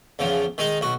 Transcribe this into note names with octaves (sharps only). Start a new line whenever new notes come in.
E2 C#3 F3
D#3 G#3 D#4
B1 F#4